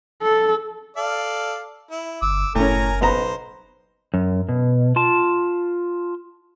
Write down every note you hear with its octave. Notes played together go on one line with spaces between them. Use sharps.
A4
A4 D5 F5
E4
G1 D6 E6
F#1 A2 C#4 A#4 G#5 A#5
B1 B3 C5 A#5
F#2
B2
F4 A5